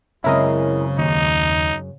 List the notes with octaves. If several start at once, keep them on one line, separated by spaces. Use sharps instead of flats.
F#2 C#3 G#3 C4 E4 A#4 D#5
D#2 D#4